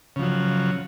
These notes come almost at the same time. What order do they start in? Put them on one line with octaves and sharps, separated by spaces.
C#3 F3 F#3